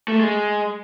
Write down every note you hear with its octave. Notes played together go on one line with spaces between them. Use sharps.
A3
G#3